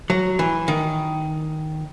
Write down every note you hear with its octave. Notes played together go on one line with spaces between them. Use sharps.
F#3
E3
D#3